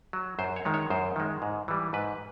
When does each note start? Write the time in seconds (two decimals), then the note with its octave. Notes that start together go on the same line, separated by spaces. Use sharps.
0.13 F#3
0.39 F#2 C5
0.56 C#5
0.65 D#3 G#3
0.74 C#5
0.90 F#2 C5
1.16 D#3 G#3
1.42 G#2
1.68 E3 G3
1.93 G#2 B4